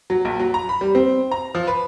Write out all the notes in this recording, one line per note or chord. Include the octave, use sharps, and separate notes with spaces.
F#3
A#1
F#3
A#5
B5
G3
C4
A#5
F3
B4